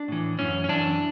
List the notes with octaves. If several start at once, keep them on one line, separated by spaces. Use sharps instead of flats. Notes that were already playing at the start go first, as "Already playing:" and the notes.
Already playing: D4
A2 E3
F#2 E3 C#4
C#4
F#2 E3 D4